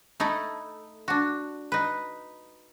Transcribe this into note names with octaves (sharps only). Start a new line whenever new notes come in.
A3 D#4 E4 A4
D4 F#4
D#4 B4